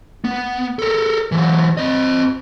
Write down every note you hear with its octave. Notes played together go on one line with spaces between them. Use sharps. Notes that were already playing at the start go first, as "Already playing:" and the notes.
B3
A4 A#4
E3 F#3
C4 D#5